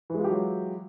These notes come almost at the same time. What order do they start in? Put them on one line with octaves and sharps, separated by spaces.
E3 G#3 F4 G4 F#3